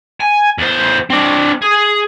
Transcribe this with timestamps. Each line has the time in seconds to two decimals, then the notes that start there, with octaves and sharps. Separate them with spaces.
0.20 G#5
0.58 E2 C5
1.10 C4 D4
1.62 G#4